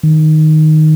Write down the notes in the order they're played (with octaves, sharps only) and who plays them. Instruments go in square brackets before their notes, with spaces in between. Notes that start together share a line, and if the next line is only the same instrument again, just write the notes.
[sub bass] D#3